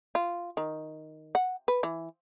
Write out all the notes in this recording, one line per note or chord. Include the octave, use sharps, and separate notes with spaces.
F4
D#3
F#5
B4
E3